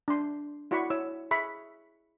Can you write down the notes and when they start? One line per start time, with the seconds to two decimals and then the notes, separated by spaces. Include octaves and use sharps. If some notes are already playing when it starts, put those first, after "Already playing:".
0.08 D4 C6
0.71 E4 F#4 D5 F#5 B5 C#6
0.90 E4 C#5 E6
1.31 G#4 E5 B5 C#6